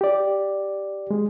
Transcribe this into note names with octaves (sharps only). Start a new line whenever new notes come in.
G4 D5
G#3